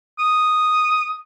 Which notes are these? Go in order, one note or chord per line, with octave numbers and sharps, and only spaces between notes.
D#6